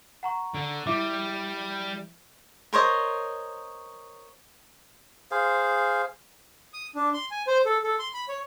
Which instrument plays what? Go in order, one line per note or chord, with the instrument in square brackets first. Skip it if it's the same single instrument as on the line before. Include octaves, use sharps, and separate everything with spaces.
[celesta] F#5 A#5 C#6
[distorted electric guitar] D3
[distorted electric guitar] G3 [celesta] E4 E5 D6
[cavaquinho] A#4 C5 C#5 D#5
[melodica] G#4 C5 F5
[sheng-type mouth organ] D#6
D4
C6
G#5
C5
A4
A4
C6
B5
C#5